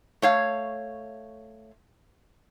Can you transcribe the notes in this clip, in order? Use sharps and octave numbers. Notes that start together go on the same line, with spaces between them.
A3 C#5 F5